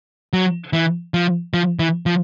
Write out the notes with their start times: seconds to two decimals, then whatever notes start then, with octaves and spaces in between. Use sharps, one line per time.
0.33 F#3
0.73 E3
1.14 F3
1.54 F3
1.79 E3
2.06 F3